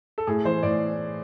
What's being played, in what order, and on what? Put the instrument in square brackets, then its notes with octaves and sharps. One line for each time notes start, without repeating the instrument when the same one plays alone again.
[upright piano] A4
A2 G#4
E3 C5
A2 D5